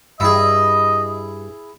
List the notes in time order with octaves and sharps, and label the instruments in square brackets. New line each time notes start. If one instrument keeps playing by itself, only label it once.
[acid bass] G2 [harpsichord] E4 G#4 [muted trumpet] D#5